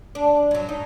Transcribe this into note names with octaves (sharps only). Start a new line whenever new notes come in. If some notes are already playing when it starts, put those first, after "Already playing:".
D4
F#2 F#3
D#4